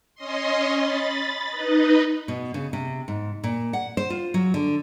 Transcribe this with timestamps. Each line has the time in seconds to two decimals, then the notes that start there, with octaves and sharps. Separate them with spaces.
0.15 C#4 D#5 C6
0.78 B5 A6
1.50 D#4 B4 D#5
2.28 B2
2.54 C#3
2.73 C3
3.08 G#2
3.44 A#2
3.73 F#5
3.97 C5
4.10 F4
4.34 F#3
4.54 D3